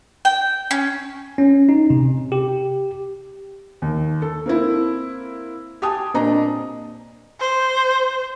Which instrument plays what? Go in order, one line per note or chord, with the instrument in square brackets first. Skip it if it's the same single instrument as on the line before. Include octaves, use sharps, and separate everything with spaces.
[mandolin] G5
C#4
[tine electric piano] C#4
D#4
C3
G4
[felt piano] D#2
A4
A#3 C4 E4
G4 G#5 A5 D#6
A#2 C4 D4 D#5 A#5
[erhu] C5